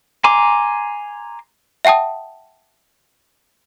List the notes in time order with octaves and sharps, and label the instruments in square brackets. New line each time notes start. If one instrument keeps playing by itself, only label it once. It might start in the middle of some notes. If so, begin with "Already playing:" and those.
[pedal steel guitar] G#5 A#5 C6 D6
[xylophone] E5 F#5 G5 A5 D#6